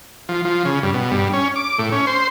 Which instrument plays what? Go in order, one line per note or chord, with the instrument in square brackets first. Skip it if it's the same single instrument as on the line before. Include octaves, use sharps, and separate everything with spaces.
[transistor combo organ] F3
F3
C#3
G2
B2
G2
C#4
D6
A2
C#4
C5